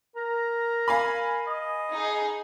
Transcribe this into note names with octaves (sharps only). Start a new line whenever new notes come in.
A#4 A#5
F5 G#5 B5
D#5
D#4 G#4